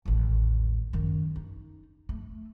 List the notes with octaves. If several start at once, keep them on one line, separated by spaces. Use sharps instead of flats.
A1 D#2
F#2 D#3
D#4
A3